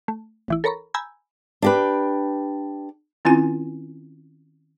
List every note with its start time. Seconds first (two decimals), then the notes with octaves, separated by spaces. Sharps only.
0.08 A3
0.48 A1 E3 E4
0.64 A4 A#4 C#5 A#5 B5 C#6
0.94 G#5 A#5 B5 E6 G6 G#6
1.62 D4 G4 B4
3.25 D#3 C4 C#4 E4 F4 G#5